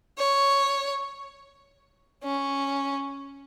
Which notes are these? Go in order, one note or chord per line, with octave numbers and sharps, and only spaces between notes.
C#5
C#4